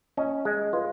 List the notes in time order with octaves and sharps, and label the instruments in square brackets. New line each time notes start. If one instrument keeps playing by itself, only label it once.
[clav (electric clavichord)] C#4 [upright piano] D#5
[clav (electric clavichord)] G#3 [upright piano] D#5
[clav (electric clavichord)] F4 [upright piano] B4